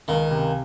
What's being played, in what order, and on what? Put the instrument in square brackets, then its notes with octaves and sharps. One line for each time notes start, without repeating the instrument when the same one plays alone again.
[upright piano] C#2 [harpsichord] D#3
[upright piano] C3